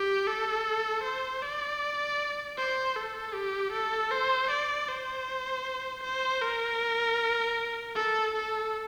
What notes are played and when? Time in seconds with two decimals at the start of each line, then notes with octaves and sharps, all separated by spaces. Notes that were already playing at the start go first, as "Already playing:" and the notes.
Already playing: G4
0.27 A4
1.04 C5
1.42 D5
2.58 C5
2.96 A4
3.34 G4
3.73 A4
4.11 C5
4.50 D5
4.88 C5
6.03 C5
6.42 A#4
7.96 A4
8.34 A4